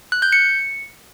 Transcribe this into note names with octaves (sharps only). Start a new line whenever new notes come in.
F#6
G6
C#7